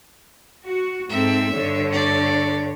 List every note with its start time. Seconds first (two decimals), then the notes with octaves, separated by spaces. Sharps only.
0.67 F#4
1.09 G#2 C4 A4 E5
1.51 G2 D3 C#5
1.91 A3 D5